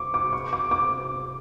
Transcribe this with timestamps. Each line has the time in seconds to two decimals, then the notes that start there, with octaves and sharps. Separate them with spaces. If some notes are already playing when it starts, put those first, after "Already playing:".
Already playing: C#6 D6
0.14 D6
0.33 C#6
0.53 D6
0.71 D6